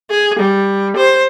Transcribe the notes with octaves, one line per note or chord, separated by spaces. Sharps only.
G#4
G3
C5